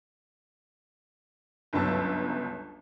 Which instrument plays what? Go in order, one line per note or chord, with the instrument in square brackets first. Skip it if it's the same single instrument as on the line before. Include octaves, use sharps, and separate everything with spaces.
[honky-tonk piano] G1 C#2 F#3 A5 E6